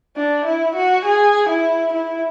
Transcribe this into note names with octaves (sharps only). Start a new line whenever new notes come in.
D4
E4
F#4
G#4
E4
E4